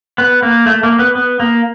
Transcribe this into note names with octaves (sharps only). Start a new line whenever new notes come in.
B3
A#3
A3
A#3
B3
B3
A#3